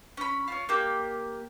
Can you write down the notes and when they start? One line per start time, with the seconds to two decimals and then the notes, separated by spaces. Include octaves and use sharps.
0.17 C#4 B5
0.48 C#4 F4
0.69 A#3 G4